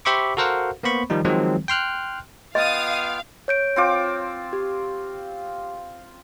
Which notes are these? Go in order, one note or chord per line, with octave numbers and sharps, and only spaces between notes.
G4 C5 E5 B5 C#6 D6
F#4 A4 A#4 C5 F5 F#5
A#3 B3 C5 B5 C#6
D#3 F3 G3 D#4
D#3 F3 F#3 G#3 C4
G5 C6 F6 F#6
B3 F4 D#5 F5 G5 D#6 D#7
C#5 G6 D7
C4 F4 D6
G4